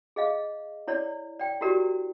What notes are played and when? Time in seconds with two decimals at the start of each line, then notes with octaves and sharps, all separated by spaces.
0.16 G#4 D#5 F5
0.87 E4 C#5 D5
1.39 D5 G5
1.61 E4 F#4 G4 A#4 D5